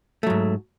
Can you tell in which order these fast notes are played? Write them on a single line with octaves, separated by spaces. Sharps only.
A3 F#3 G#2